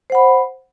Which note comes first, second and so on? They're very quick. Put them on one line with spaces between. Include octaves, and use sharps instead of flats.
C5 F#5 B5